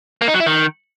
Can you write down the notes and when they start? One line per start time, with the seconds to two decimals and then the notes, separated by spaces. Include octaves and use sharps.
0.22 A#3
0.28 D#4
0.34 F#3
0.40 E4
0.46 D#3